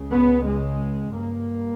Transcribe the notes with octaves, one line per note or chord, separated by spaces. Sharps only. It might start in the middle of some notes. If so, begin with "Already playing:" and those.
Already playing: C#2 C#3
B3
G#3
G2 A#3